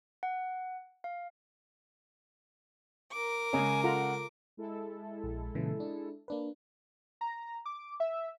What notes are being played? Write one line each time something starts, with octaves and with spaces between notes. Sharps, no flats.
F#5
F5
A#4 D6
C#3 G#3 C#5 D#5 G#5 A#5
F4 A4 F#5 A#5
G#3 E4 A4
A#1
A#2 C#3 E3
D4
A#3 D4 B4
A#5
D6
E5